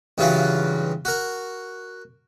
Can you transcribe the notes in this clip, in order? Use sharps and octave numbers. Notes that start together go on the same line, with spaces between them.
G2 C#3 E3 F#3 F4 F#4
F#4 A#4